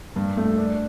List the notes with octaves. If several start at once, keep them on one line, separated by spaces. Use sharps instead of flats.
G2
A3
D4